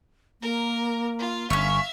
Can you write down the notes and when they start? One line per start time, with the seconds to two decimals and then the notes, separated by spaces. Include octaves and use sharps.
0.42 A#3 A#4
1.19 F4
1.50 G1 C#4 C#5 E5 F5